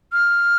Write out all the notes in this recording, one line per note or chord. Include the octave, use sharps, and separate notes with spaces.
F6